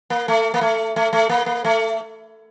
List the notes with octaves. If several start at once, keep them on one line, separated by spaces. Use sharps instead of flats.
A#3
A3
A#3
A3
A3
A3
A#3
A#3
A3